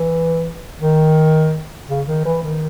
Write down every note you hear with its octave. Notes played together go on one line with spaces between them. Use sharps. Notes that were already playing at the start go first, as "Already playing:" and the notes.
Already playing: E3
D#3
C#3
D#3
E3
D#3